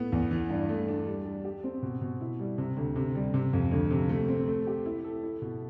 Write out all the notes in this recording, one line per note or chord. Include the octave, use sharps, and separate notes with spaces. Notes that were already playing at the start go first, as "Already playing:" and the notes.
Already playing: A2 B3
E2
E3
G2
A3
D4
G3
G3
G4
C4
B2
B2
E4
G3
C3
D2
C3
G3
C3
F2
D2
C3
A3
C4
A3
G4
E4
A4
E4
B2